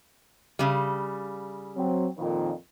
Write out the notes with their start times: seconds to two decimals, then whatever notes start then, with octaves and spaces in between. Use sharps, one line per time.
0.59 C#3 G3
1.76 F#3 C4
2.18 F2 A#2 D#3